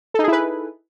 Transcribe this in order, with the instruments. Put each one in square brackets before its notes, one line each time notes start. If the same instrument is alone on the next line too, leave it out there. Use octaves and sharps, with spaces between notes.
[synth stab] A4
D#4
G#4
E4
B4